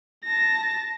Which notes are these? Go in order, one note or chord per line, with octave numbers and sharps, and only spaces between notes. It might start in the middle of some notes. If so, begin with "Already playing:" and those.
A5 A#6